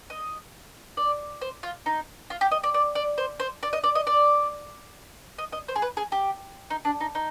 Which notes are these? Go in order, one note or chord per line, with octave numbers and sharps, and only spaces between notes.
D#5
D5
C5
F4
D#4
F4
G4
D#5
D5
D5
D5
C5
C5
D5
D#5
D5
D#5
D5
D#5
D#5
C5
G#4
B4
G#4
G4
D#4
D4
D#4
D#4